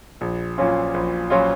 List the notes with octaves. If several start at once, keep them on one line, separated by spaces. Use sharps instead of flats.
A#1
A#2 F#3 C#4 F4
A#1
A#2 F#3 C#4 F4